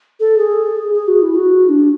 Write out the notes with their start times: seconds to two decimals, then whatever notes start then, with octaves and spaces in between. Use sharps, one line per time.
0.20 A4
0.38 G#4
0.94 G#4
1.08 F#4
1.22 E4
1.35 F#4
1.69 D4